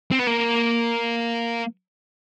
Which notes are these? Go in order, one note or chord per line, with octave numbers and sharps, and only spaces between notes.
C4
B3
A#3